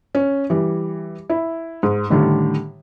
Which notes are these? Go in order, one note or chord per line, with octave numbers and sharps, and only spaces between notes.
C#4
E3 G3
E4
G#2
A2 D3 D#3 G3